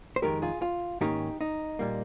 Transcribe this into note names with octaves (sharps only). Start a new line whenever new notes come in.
C5
F2 D#3 G#3 D#4 G4 A#4
F4 G#4
F4
G#2 D#3 A#3 C#4 D#4 G4
D#4
A#2 G3 A#3